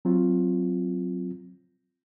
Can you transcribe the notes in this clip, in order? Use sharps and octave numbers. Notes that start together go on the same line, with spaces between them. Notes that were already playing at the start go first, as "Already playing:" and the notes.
F#3 C4 F4